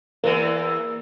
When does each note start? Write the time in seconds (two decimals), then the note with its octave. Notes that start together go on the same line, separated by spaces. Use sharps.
0.24 E2 E3 A#3